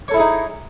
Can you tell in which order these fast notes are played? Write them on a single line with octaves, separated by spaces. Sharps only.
C#5 A4 E4 G#4 D#4